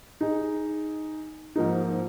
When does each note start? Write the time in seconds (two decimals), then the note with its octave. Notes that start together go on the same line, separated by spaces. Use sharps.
0.21 D#4 G#4
1.56 G#2 F3 A#3 D#4